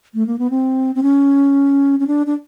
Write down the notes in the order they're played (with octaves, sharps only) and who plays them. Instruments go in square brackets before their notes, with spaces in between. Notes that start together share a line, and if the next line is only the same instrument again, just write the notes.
[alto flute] A3
A#3
B3
C4
C4
C#4
C#4
D4
D4